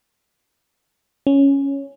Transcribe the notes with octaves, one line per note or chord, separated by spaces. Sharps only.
C#4